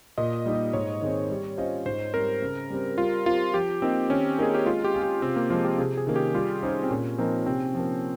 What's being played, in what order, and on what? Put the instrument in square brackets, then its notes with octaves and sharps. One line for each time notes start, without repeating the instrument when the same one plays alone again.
[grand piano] A#2 [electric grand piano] D#5
[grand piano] G3 A#3 D#4 G4
[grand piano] G#2 [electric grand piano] C#5
[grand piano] D#3 G#3 C4
G3
C#4 F4 C5 D#5
[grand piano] G#2 [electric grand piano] C5
[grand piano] G3 C4 [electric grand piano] A#4
[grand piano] C#3
G3 C4
[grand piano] G3 [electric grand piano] F4
[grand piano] C4 G4 [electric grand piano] F4
[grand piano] F3 [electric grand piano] G4
[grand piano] A#3 D#4 [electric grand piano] C4
[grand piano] D#3 [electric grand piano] C#4
[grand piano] A#3 D#4 A#4 [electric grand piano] G#4
[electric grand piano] G4
[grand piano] G#3 [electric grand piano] F4
[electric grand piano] G4
[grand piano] C#4 G#4
[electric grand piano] G4
[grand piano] C3 [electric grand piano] C4
[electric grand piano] A#3
[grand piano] F3 G#3 [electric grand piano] F4
[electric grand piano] G4
[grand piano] C3 [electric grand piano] G#4
[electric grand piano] G#4
[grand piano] D#3 A#3 C#4
[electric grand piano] G4
[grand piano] G3 [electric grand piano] F4
[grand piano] C#4 G#4 C5 [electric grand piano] D#4
[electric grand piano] C4
[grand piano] A#2 [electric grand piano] C#4
[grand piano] F3 A#3 D#4 A#4 [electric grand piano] C4
[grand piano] C3 [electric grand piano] C4
[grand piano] F3 A#3